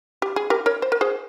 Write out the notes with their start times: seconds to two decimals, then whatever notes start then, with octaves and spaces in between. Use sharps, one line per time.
0.22 G4
0.36 G#4
0.50 G4 A#4
0.66 A#4 C#5
0.82 C5
0.92 A#4
1.01 G#4 C5